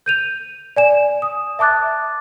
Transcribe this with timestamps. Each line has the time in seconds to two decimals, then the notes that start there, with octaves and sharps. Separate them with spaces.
0.06 G6 D#7 F7
0.76 D5 G#5 E7
1.22 D#6
1.59 E5 A5 D6 F#6 A6